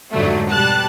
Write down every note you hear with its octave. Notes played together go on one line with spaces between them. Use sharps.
F2 G#2 D3 F#3 G3 A3
B2 G3 A5 F#6